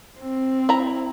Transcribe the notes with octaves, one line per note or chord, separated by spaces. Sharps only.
C4
E4 A#5